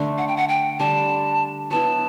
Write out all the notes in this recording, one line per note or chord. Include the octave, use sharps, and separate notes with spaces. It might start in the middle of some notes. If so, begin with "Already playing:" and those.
Already playing: D3 A3 D4
F#5
G5
F#5
G5
D3 G3 D4 A5
F#3 B3 E4 A5